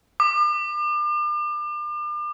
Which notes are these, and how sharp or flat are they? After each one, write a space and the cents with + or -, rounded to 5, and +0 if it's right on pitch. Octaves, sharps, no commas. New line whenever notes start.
D6 +40